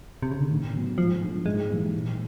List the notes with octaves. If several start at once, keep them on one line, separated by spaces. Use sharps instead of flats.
C3
C#3
D3
A2 D#3
F#3 B3
G#2 F3
F3 A3 D4
G#2 G#3
E3 G3 A#3
A#2